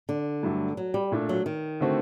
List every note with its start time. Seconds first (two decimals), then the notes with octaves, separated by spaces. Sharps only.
0.09 D3
0.43 G2 F#3 A3
0.77 F#3
0.94 G3
1.12 A#2 A3 D4
1.29 F#3
1.46 D#3
1.80 D3 A3 C4 F#4 C5